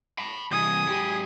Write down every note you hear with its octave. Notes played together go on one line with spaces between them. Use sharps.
A5 B5
C2 E3 G#5 D#6
G#2 G4